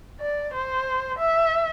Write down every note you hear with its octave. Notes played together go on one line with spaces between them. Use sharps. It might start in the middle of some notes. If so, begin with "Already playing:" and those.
D5
C5
E5